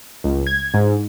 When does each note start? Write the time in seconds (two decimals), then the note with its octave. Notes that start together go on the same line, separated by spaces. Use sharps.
0.24 C#2
0.47 G#6
0.74 G#2